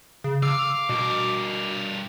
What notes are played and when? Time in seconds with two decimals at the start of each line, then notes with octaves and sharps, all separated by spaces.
0.24 C#3
0.43 F5 D6 E6
0.89 G2 B2 A#4